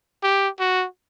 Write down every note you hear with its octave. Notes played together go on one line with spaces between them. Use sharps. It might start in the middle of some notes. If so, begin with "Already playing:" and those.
G4
F#4